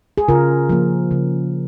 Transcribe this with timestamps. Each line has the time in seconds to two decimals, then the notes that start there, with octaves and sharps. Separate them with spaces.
0.18 G#4
0.28 C#3 F4 A#4
0.69 F3 A#3
1.11 C#3